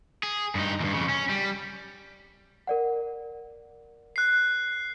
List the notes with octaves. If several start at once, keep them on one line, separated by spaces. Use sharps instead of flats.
G#4
G2 D#4
E2 G2
F2 C#3
C#4
G3
A#4 D5 F#5
F#6 C7